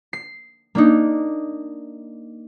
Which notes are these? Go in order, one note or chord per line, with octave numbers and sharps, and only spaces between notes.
C7
A#3 D4 D#4